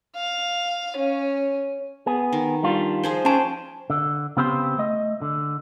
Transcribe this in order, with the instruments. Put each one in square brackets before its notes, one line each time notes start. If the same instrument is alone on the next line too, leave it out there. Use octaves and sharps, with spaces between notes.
[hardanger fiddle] F5
C#4
[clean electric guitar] B3 G#4
[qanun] D#3
[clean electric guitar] G3 D4 F4
[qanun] F3 G#4 C5
[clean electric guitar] C#4 A5 [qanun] G#4 G5
[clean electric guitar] D3
C#3 B3 C4 G4 C5 C6
A3 D#5
D3